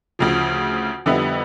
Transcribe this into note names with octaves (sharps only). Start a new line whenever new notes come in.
D2 C#3 F3
F2 D3 G3 B3 E4